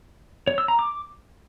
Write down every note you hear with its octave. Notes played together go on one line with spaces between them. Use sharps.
C#5
E6
A#5
D6